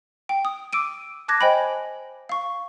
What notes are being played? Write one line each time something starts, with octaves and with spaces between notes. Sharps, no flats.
G5
D#6
D6 E6 D7 D#7
A5 D6 F#6 G#6 A#6
C5 D#5 G5 G#5 B5
F5 C#6